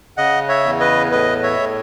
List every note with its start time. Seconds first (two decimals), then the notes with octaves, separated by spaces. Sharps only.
0.17 C#3 D#5 F#5
0.49 C#5 E5
0.65 E2
0.80 B4 D#5
1.12 A2 B4 D#5
1.43 C#5 E5
1.59 A2